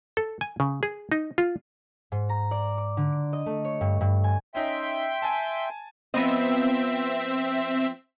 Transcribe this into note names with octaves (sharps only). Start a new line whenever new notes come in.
A4
G#5
C#3
G#4
D#4
F4
G#2
A#5
D5
D6
D3
D7
D#5
A3
C#5
G2
G2
G#5
C#4 D#4 E5 G5 C6
G#5 A5
F3 B3 C4 D#5 E5